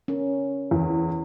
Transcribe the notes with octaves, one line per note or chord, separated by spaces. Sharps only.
C#4 A#4
E2